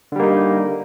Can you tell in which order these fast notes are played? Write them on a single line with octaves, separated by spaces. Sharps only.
D3 G3 A#3 D#4